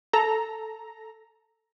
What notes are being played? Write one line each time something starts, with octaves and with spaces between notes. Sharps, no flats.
A4 A#5